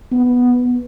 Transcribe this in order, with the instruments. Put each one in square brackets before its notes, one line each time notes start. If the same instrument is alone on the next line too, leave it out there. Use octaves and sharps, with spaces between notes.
[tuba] B3